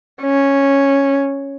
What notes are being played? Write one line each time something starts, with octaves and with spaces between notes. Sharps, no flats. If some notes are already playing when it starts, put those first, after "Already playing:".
C#4